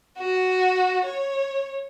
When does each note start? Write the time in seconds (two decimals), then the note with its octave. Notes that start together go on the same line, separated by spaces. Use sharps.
0.18 F#4
1.04 C#5